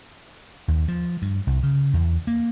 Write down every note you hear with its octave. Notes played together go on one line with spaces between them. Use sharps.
D#2
F3
G2
C2
C#3
E2
A#3